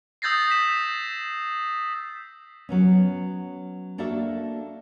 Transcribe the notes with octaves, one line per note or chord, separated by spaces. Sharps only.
D#6 E6 G6 A6 A#6 C7
B6 E7
F#3 B3 C#4
A#3 D4 F#4 A4 E5